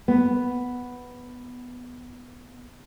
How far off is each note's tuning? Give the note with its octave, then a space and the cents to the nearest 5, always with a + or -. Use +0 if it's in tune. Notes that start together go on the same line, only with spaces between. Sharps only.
B3 +0